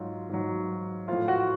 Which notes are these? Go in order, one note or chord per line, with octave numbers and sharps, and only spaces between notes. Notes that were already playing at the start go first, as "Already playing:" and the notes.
Already playing: G#2 F#3 F4
G#2 F#3
A2 F3 F4 F5
F#4 F#5